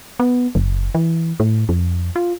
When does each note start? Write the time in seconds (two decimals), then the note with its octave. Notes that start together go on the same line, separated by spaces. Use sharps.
0.20 B3
0.55 F#1
0.95 E3
1.40 A2
1.69 F2
2.16 F4